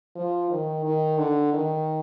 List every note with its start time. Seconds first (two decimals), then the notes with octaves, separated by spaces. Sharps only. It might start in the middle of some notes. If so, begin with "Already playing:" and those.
0.16 F3
0.50 D#3
0.85 D#3
1.18 D3
1.53 D#3